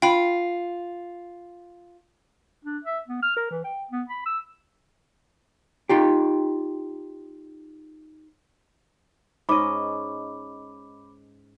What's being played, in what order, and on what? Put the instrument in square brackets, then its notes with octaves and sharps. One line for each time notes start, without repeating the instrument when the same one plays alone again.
[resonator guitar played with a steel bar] F4 [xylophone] G5 B5
[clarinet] D4
E5
B3
F6
A#4
E3
G5
B3
B5
E6
[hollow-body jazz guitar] D#4 F4 G4
[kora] G#2 C#4 D#5 [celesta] B5 D6